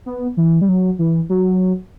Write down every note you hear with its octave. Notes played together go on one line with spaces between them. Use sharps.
B3
E3
G3
F#3
E3
F#3